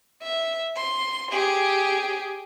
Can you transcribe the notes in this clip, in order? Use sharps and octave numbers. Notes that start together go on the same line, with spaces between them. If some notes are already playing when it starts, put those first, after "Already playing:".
E5
C6
G4 G#4